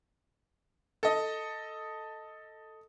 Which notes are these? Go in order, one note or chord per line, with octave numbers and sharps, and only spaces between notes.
A4 D#5